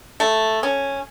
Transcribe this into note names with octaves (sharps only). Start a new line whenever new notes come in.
A3
C#4